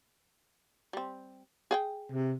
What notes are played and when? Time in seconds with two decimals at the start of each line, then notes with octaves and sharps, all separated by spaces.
0.93 G3 C4
1.71 G#4 F#5 G5
2.12 C3